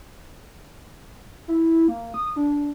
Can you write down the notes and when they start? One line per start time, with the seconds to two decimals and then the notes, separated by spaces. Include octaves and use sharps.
1.48 E4
1.88 A#3
2.14 D#6
2.36 D4